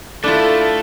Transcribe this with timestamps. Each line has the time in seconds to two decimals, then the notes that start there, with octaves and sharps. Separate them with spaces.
0.24 A3 D4 E4 F4 A4